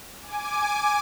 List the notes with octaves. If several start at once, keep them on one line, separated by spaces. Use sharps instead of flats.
G#5 D6